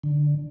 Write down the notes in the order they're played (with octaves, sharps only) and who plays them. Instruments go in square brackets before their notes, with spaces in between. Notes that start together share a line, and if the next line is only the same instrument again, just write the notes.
[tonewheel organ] D3